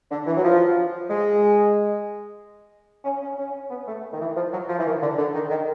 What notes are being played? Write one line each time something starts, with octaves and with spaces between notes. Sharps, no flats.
D3
E3
F#3
F3
G#3
C#4
C#4
C#4
B3
A3
D#3
E3
F3
F#3
F3
E3
D#3
D3
D3
D#3
D#3